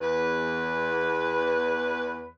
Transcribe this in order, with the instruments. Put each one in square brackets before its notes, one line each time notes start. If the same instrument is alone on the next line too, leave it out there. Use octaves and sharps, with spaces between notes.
[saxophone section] E2 B4